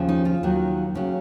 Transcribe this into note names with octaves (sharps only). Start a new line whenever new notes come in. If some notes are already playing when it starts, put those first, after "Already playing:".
Already playing: D#2 C#3 F3
D#4
F4
D#2 D#3 F#3
D#2 C#3 F#3 C#4